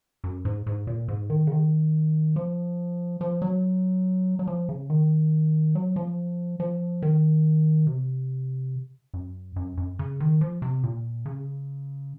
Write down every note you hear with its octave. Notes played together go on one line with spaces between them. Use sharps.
F#2
G#2
G#2
A#2
G#2
D#3
C#3
D#3
F3
F3
F#3
F#3
F3
C#3
D#3
F#3
F3
F3
D#3
C3
F#2
F#2
F#2
C#3
D#3
F3
C3
A#2
C#3